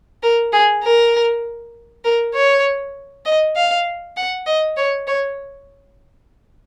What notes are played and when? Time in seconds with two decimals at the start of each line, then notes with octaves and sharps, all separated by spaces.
0.23 A#4
0.52 G#4
0.83 A#4
2.05 A#4
2.34 C#5
3.25 D#5
3.56 F5
4.17 F#5
4.46 D#5
4.77 C#5
5.07 C#5